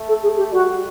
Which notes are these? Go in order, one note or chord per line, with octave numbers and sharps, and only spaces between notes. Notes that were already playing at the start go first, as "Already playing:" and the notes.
Already playing: A3
A4
G#4
G4
G3 F#4